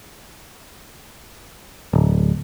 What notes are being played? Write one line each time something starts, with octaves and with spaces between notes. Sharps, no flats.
D1